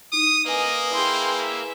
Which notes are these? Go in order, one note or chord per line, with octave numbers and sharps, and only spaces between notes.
D#4 E4 D#6
A#3 B4 D#5 G#5 D#6
E4 G#4 G5 C6
E5